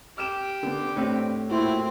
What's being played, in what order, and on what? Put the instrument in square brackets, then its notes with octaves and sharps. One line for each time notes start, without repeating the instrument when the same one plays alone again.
[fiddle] G4 [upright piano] F6 E7
[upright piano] D3 B3
[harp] A2 B4 [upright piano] C4 D4
[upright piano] A#2 F#4 [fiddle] C4 [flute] E4